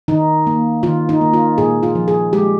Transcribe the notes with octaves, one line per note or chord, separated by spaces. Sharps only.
D#3 D#4
A#3
D#3 F4
D#4
A#3
F4
A#2 G#4
F4
F3
G#4
G#3 G4